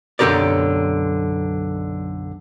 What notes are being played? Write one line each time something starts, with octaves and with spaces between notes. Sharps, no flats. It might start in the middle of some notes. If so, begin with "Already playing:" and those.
B1 F#2 D3 G4 A#4 D5